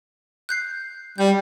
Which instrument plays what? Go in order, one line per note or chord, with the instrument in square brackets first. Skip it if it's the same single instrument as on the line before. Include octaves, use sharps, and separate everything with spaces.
[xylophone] F#6 G6 C7
[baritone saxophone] G3 [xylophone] G6